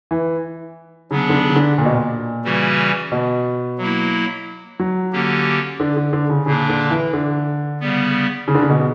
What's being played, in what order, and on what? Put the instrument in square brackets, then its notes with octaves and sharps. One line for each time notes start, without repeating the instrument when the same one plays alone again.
[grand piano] E3
[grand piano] C#3 [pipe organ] F#3 B3 D4
[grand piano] D3
C#3
C#3
D3
A#2
B2
A#2
[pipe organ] C#3 E3 G3 C#4 F#4
[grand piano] B2
[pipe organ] F#3 A#3 E4
[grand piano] F#3
[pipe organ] D3 A#3 C#4 G4
[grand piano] D3
D3
D3
C#3
[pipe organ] A#2 A#3 D4 [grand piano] C#3
[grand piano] D3
E3
D3
[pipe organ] C#3 G3 B3
[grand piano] C#3
D3
C#3
B2